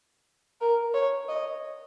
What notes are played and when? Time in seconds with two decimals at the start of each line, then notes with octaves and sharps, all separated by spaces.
0.61 A#4
0.94 C#5
1.28 D#5